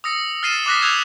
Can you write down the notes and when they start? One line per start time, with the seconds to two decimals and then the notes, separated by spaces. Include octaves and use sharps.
0.04 D#6 E6 A#6 C#7
0.43 F6 A6 C7 D#7 E7
0.66 D6 D#6 F#6 A#6 B6
0.82 D#6 E6 F#6 G#6 F7